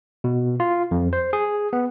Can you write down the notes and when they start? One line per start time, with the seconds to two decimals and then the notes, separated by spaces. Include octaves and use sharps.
0.24 B2
0.60 F4
0.91 F2
1.13 C5
1.33 G#4
1.73 B3